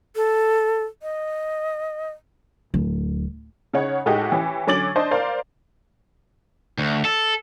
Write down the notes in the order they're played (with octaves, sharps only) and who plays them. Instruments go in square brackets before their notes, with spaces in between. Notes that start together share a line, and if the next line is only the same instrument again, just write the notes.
[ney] A4
D#5
[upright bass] D1
[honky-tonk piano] C#3 D#4 C#5 F#5
A2 G#3 A3 D#4 F#4 G4
E3 C#4 G4
D3 F#3 C#4 D6 A6 F#7
D4 C5 D#5 A5
A#4 C5 D5 F5
[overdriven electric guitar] D2
A4